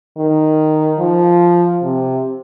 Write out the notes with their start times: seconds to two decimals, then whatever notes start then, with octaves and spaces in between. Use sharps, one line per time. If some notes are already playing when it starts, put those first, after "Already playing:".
0.18 D#3
0.99 F3
1.83 C3